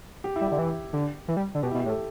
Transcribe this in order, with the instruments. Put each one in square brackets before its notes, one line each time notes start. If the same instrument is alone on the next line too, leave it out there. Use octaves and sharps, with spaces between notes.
[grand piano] G4
E4
[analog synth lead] G3
[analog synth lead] D3 [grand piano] G4
[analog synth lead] E3
D3
E3
G3
D3
[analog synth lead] B2 [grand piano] G4
[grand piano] E4
[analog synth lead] B2
[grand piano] G4
[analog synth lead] A2
[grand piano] A4